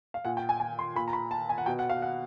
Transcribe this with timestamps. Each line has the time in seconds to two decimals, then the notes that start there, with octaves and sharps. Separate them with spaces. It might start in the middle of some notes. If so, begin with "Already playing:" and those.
0.14 F5
0.25 A#2 F#5
0.37 G5
0.49 G#5
0.60 G#5
0.79 C6
0.95 A#2 B5
1.08 A#5
1.13 B5
1.31 A5
1.49 G#5
1.58 F#5
1.66 B2 G5
1.79 F#5
1.90 F5
2.02 F#5